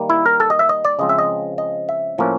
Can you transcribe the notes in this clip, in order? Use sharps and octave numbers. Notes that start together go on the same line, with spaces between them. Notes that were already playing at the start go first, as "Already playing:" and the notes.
Already playing: D#3 G3 A#3
E4
A#4
A4
D#5
E5
D#5
D5
C#3 F3 G#3 C4 D#5
E5
D#5
D#5
E5
A2 F3 A#3 C#4